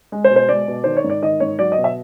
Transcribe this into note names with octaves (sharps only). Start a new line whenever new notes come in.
G#3
C5
B2
C5
G#3 D5
B2
D#3 C5
C#5
G#2
D5
D#3 D#5
G#2 C#5
F#3 D5
D#5
B2
E5